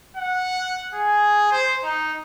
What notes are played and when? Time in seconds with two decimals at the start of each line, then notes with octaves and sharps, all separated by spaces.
0.17 F#5
0.94 G#4
1.52 C5
1.83 D#4